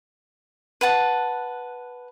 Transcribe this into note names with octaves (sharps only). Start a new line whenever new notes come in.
B4 F#5 A5